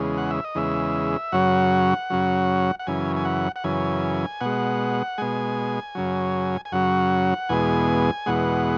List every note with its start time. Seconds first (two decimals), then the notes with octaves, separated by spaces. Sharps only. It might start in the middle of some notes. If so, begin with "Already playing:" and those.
Already playing: E2 C#3 G#3
0.17 F#5
0.31 E5
0.45 D#5
0.55 E2 C#3 G#3 E5
1.32 F#2 C#3 F#3 F#5
2.10 F#2 C#3 F#3
2.79 F#5
2.87 F#2 C#3 E3 G#5
3.16 G#5
3.25 F#5
3.56 F#5
3.64 F#2 C#3 E3 G#5
4.41 B2 G#3 F#5
5.18 B2 G#3 G#5
5.95 F#2 C#3 F#3
6.65 G#5
6.72 F#2 C#3 F#3 F#5
7.49 E2 B2 G#3 G#5
8.26 E2 B2 G#3 F#5